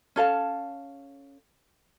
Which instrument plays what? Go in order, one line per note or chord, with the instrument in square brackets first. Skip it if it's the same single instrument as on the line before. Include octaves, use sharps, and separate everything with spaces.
[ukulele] C#4 A4 F5 A5